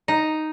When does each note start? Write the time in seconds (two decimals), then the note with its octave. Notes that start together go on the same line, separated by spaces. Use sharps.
0.08 D#4